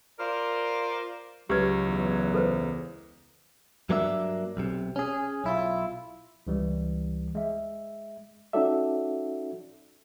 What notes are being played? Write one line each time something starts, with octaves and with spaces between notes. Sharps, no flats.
F4 A#4 C5 D5
C#2 F#3 G4 B4 G#6
E2
A4 B4 C5
G2 F#3 A#3 D4 C#5 E5
B1 C3
C#4 G#4
B1 E4 F4
C#2 E3 G3
G#3 E5
C#4 D#4 F#4 A4 D5 E5